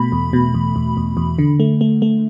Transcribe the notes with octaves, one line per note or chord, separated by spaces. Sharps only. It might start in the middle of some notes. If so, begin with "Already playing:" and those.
Already playing: B2 A3 B5
E2
B2
E2
E2
E2
E2
D3
A3
A3
A3